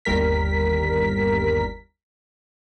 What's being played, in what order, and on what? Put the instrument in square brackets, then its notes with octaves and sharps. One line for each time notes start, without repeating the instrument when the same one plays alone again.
[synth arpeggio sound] G1 D#2 G3 A#4 B6